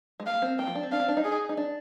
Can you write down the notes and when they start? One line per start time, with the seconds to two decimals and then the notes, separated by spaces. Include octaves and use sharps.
0.20 G#3
0.26 A#3 F5
0.42 C4
0.58 A#3 G5
0.67 F3
0.75 D4
0.83 C4
0.92 D4 F5
1.00 C4
1.08 D4
1.17 D#4
1.24 G#4
1.49 D#4
1.57 D4